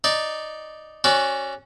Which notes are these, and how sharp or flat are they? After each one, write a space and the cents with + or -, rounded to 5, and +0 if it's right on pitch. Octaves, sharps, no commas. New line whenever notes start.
D#4 +0 D5 +0
C#4 -15 F#4 +0 D5 -25